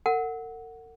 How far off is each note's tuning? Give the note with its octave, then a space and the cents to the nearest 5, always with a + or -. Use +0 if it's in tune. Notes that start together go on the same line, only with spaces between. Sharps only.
A#4 -45 F#5 +0